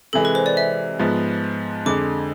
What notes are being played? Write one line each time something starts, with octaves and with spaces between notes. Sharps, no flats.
C3 E3 G#3 A4
B4
C5
D5
E5
G#2 F3 B3
F2 D3 G#3 D6